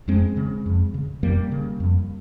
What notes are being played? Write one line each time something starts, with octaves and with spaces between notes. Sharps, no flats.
F2 G#3 C4
C#3
F2
C#3
F2 G3 A#3
C#3
F2